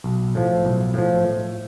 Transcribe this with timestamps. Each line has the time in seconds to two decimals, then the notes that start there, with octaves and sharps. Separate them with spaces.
0.04 B1
0.35 A2 F3
0.65 B1
0.94 A2 F3
1.24 A2